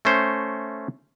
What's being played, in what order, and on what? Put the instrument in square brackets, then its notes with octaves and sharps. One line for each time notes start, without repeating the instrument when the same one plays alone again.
[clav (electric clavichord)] A3 C#4 C5